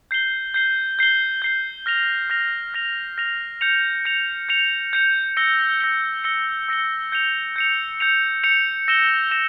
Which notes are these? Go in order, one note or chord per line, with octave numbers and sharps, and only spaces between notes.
G6 C7 G7
G6 C7 G7
G6 C7 G7
G6 C7 G7
F6 A#6 F7
F6 A#6 F7
F6 A#6 F7
F6 A#6 F7
G6 C#7 F7
G6 C#7 F7
G6 C#7 F7
G6 C#7 F7
E6 A#6 C#7 G7
E6 A#6 C#7 G7
E6 A#6 C#7 G7
E6 A#6 C#7 G7
G6 C#7 F7
G6 C#7 F7
G6 C#7 F7
G6 C#7 F7
E6 A#6 E7 G7
E6 A#6 E7 G7